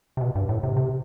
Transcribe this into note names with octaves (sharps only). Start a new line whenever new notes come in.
C3
B2
G2
A2
C3
C3